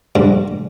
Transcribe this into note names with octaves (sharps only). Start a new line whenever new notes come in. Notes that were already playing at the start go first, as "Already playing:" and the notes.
G2